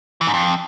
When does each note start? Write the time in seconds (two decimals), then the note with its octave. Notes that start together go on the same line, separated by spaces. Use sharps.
0.21 E3
0.27 G#2
0.34 F2